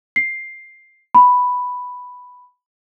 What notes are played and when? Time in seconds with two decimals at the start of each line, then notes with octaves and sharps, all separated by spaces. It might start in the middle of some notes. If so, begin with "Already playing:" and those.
0.16 C7
1.15 B5